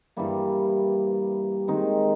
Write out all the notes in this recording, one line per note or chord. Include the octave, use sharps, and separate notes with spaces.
G2 E3 G3 A#3
D#3 G#3 C4 D#4